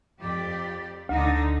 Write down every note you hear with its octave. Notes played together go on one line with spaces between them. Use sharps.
F2 G4 D5
D2 D3 D#4